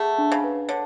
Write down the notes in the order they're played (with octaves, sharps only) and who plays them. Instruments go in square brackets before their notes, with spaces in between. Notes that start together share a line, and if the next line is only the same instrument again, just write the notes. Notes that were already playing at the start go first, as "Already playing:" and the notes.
Already playing: [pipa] A3 [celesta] G#4 F#5
[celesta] D4
[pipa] C#3
[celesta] B4
[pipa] D3 [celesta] C#5